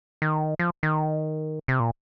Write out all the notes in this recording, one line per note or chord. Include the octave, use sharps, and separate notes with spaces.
D#3
F3
D#3
C3
A#2